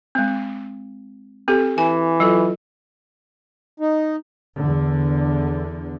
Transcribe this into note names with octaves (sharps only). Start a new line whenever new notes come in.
G#3 C4
C4 G4 A4
E3 G#5
F#3 F4 A4
D#4
E2 D3